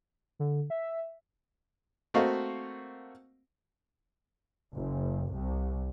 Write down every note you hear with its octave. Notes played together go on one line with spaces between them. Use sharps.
D3
E5
A3 A#3 C4 F#4 D#5 F5
F#1
C2